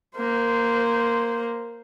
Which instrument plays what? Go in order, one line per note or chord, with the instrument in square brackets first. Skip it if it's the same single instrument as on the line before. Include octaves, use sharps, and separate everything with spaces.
[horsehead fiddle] A#3 C5